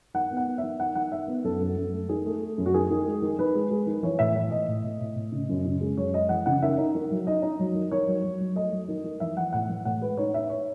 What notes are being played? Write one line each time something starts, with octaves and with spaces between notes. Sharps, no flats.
D#3 F#5
B3
F#5
B3
E5
D#3
D#3 F#5
D#3 F#5
D#3 E5
B3
F#2 A4
F#2
F#2
A3
D#3 G#4
A3
A3
F#2
F#4
D#3 G#4
D#3
G#3
D#3
D#3 B4
G#3
G#3
D#3
E3 C#5
A2 E5
E3 E5
A2 D#5
A2
A2
A2
A2
C#3
F#2
C#3
G#3
F#2 C#5
G#3 D#5
E3 F#5
C#3 F#5
D#3 E5
D#4
D#3
F#3
D#4 D#5
D#4
F#3
D#3
D#3 C#5
F#3
F#3
F#3
A3 D#5
F#3
D#3
D#3
E3 E5
E3 F#5
A2 F#5
E3
A2 F#5
G#3 B4
D#4 C#5
D#4 E5
C#5